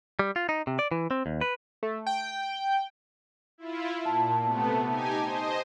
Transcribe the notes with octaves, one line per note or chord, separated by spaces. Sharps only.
G3
F4
D#4
C3
D5
E3
C4
D#2
B4
A3
G5
E4 F4
A#2 A5
C3 A3 B3
D#4 G4 G#5
C5 D#5